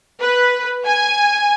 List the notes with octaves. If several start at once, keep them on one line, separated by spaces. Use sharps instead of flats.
B4
G#5